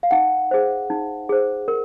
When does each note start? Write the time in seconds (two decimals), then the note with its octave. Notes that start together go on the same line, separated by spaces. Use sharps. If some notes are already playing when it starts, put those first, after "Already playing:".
0.03 F5
0.11 D#4 F#5
0.51 G#4 C5
0.90 D#4
1.29 G#4 C5
1.68 A#4